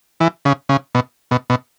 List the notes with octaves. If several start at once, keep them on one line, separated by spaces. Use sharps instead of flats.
E3
C#3
C#3
B2
B2
B2